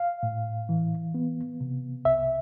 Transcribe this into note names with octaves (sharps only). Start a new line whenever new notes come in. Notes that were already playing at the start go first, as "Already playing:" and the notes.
Already playing: F5
A2
E3
B3
C3
C2 E5